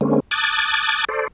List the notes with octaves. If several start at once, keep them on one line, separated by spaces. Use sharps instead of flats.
D3 G#3 A#3 C4 C#4
A5 D6 D#6 F#6 G#6 A6
A4 C5 D5